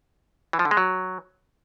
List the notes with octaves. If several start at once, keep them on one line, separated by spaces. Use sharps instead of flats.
E3
F3
D3
G#3
F#3